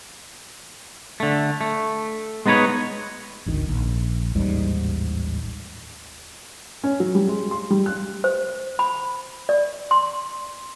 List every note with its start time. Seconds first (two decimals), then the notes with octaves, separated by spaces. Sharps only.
1.20 D3 A3
1.61 A3
2.46 G#3 B3 D#4 B4 C#5
3.46 G#1 D2 D#3
3.68 A#1
4.35 A1 D#2 G#2 G3
6.84 C#4
7.00 F#3
7.15 G3
7.28 G#3
7.51 C6
7.70 G3
7.86 F#6
8.24 C5
8.79 B5
9.49 D5
9.91 C6